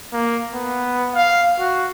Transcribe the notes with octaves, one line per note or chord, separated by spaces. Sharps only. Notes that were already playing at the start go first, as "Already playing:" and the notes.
A#3
B3
F5
F#4